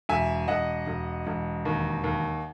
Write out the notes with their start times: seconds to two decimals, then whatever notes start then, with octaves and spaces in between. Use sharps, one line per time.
0.09 E1 E5 G#5
0.48 E1 D#5 F#5
0.87 E1
1.27 E1
1.65 D#2
2.04 D#2